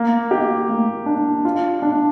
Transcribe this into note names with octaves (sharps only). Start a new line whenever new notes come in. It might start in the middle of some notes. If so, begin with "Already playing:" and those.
Already playing: A#3
G4
A#3
D4
F4
D4